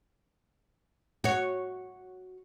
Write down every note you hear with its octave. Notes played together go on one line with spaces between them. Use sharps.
F#4 C#5